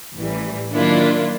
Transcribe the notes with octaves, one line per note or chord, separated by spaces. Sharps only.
A1 E3 G3
D#3 F#3 A#3 D4 E4 F4